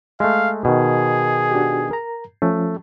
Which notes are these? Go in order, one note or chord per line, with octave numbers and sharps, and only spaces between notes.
G#3 A3 F5
B2 D#3 G#4
D4 F#4 G4
A#4 A#5
F3 A3 C#4